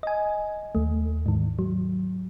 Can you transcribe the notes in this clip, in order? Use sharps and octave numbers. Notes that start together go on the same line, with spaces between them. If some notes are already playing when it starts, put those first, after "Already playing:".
D#5 G#5
D#2 A3
G#2 D#3
F#3